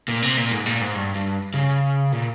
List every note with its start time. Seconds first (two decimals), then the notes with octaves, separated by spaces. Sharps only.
0.08 A#2
0.22 C3
0.37 A#2
0.51 G#2
0.66 A#2
0.81 G#2
0.95 G2
1.15 G2
1.54 C#3
2.12 A#2